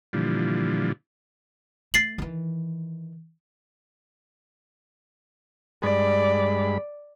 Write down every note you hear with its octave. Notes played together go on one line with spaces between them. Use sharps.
A#2 D3 E3 F3 G3
A3 A6 C7 F#7
D#3 E3
G2 G#3 D5 B5